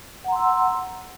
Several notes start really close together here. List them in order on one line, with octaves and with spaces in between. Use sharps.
F#5 A#5 C6 E6